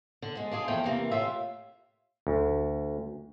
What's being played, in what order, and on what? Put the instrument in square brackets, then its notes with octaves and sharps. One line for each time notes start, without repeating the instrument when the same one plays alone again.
[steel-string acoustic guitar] D3
G#3
D4 F4 G#4
E2 F3 A3 G5
C3 E3 A#3
A2 F4 E5
[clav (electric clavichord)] D2